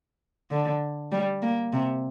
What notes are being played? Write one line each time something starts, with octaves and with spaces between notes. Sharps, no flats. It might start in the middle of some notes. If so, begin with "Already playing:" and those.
D3
G3
A#3
C3